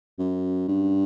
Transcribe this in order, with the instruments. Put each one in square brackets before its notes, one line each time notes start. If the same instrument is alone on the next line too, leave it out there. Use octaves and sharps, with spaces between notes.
[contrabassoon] F#2
G2